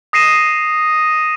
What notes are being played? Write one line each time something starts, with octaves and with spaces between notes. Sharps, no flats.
D#6 A#6 C7 D#7 E7